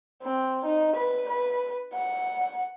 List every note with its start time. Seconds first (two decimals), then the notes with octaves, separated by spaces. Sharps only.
0.23 C4
0.65 D#4
0.96 B4
1.29 B4
1.94 F#5